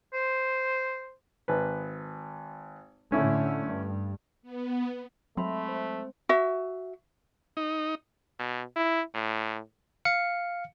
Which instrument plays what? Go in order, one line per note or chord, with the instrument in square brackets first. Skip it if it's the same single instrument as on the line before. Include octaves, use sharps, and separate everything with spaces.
[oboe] C5
[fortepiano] G#1 B4
[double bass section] A2 D3 A3 [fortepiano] C#4 E4
[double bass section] G2
[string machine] B3
[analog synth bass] F#3 [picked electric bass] G#3 C4 [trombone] A3 [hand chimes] E5 B5 C6
[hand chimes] C5
[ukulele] F#4 E5
[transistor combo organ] D#4
[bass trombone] B2
E4
A2
[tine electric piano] F5 C#7